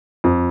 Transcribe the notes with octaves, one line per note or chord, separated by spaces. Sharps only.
F2